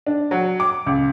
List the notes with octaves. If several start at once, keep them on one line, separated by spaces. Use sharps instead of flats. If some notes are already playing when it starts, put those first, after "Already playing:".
D4
F#3
D6
C#2